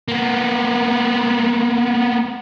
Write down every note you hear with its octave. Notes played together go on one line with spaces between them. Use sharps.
A#3 B3